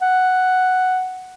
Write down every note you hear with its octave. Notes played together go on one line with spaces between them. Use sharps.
F#5